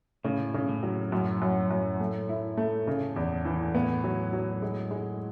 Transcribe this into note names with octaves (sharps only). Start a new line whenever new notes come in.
A2 C#3
C#3
A2
F#3
F#2 A2
F#2
F#2
A3
E4
A3
C#3
E2
E3
A2 B3
F#3
F#3
G#3
G#3